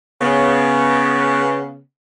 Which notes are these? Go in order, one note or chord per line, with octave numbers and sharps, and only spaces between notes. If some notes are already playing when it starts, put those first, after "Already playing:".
C#3 B3